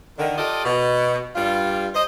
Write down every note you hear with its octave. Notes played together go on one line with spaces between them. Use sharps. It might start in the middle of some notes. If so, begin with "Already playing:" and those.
D3 D#3
F4 G4 A4 D5 D#5
B2
G2 G3 F4
C5 D#5